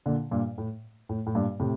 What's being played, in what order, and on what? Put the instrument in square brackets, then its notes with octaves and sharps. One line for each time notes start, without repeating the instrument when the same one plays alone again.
[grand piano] A#2 D3
G2 A#2
A2
A2
A2
G2 A#2
A2 C3